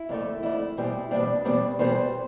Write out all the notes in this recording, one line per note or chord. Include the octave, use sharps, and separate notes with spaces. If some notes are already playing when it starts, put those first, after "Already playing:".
Already playing: E4
F2 D3 A3
F2 D3 A3 E4
E2 B2 G3 C4
E2 B2 G3 C4 D4
E2 B2 G3 C4
E2 B2 G3 C4 C5